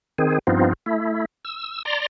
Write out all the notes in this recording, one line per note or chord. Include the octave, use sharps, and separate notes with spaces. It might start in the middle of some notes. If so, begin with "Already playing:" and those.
D#3 C4 G#4
G2 F3 B3 C4 D#4 F4
A3 E4
E6
D5 A#5 C6